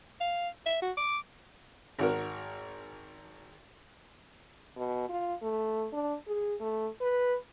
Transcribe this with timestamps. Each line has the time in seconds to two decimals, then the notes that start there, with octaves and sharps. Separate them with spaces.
0.20 F5
0.66 E5
0.82 F#4
0.97 D6
1.99 G#1 F#4 A#4
4.77 B2
5.09 F4
5.42 A3
5.93 D4
6.27 G#4
6.60 A3
7.01 B4